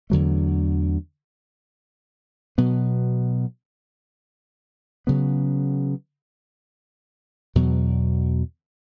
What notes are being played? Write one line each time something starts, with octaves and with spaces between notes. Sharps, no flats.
E2 D3 F#3 A3
B2 F#3 B3
C#3 F#3 B3
E2 B2 F#3